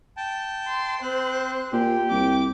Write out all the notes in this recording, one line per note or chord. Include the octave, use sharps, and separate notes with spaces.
G5 A5
C6
C4 C5 F#6
A#2 G4
C2 D6